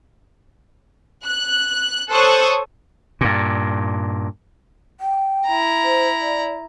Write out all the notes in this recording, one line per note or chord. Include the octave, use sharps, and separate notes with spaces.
F#6
A4 C5 C#5 C#6 D#6 F#6
G2 A#2
G5
E4 A#5
C5
D5